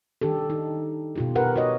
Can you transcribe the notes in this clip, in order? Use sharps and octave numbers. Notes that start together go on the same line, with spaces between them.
D#3 D4 G4 A4
D#4
B2 F4 G4
G4 A#4 B4 F#5
F#4 A#4 C#5 D#5